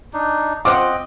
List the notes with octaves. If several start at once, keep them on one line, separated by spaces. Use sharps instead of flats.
D4 D#4
C4 F4 C5 D#5 F#5 D6